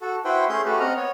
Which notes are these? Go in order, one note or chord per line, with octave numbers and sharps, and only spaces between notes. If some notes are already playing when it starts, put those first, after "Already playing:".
F#4 A4
E4 F#4 B4 C5 F#5 G5
A3 C#4 G#4 C6 G6
A3 C#4 F#4 G4 A4 B4
C4 D#5 F#5 A#5 F6
B3 C#5